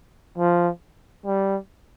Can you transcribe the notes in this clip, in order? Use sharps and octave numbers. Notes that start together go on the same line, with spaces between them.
F3
G3